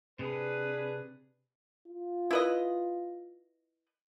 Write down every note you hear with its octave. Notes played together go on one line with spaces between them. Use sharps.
C3 D4 G#4 B4
F4
E4 B4 D#5